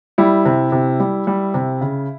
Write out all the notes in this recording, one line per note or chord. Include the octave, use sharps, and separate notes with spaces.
G3 E4
C3
C3
G3
G3
C3
C#3